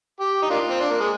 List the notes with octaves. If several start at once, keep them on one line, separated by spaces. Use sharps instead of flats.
G4
D#4
A#3 D4 F4
C4
D4
A#3
G#3